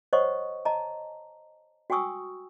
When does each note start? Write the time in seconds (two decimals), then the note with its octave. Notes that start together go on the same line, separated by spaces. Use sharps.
0.13 C5 C#5 D#5 F#5 C#6 D#6
0.65 D#5 A5 A#5
1.90 F#4 G5 G#5 C#6 D#6 E6